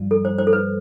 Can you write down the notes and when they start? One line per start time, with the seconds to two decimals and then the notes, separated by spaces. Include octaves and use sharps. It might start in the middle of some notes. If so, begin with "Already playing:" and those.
Already playing: G2 F3 F4
0.11 A4
0.25 C5
0.38 C5
0.47 A4
0.53 B4